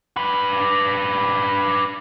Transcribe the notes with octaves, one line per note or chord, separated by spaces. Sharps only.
D4 B4